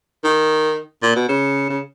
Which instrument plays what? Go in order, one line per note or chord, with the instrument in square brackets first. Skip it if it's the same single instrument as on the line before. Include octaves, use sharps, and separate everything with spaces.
[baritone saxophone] D#3
A#2
B2
C#3
C#3